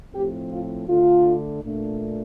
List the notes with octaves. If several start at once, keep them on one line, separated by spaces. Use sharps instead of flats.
A2 F3 C4 G4
F4
D3 A3 D4 F4
A#2 A3 D4